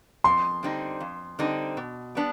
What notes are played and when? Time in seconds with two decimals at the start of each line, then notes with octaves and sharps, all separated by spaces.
0.24 F2 C6
0.63 D3 G3 C4 D#4
1.01 F2
1.39 D3 G3 C4 D#4
1.77 B2
2.15 G3 B3 D4